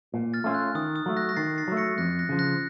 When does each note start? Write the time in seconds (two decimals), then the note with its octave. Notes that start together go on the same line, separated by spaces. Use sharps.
0.14 A#2
0.34 F6 A6
0.44 A3 C#4 F4
0.55 F#6
0.75 D#3 D#6
0.96 D#6
1.06 F#3 A3
1.17 F#6 A#6
1.29 A#6
1.37 D#3 A6 C7
1.58 A6 C7
1.68 F#3 A3
1.77 A#6 C#7
1.98 F2 F#6 A#6
2.19 F#6 A#6
2.29 C#3 F3
2.39 F#6 A#6